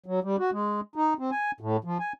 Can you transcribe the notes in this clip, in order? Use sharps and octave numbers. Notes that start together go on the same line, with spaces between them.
F#3
G3
F#4
G#3
D#4
C4
G#5
A2
F3
G#5